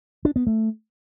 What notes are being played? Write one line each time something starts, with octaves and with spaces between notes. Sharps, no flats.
D4
B3
A3